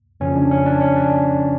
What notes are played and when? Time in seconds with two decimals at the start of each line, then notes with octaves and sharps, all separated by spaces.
0.20 F2 C#3 F3 C#4
0.35 D4
0.51 C#4
0.66 D4
0.81 C#4
0.96 D4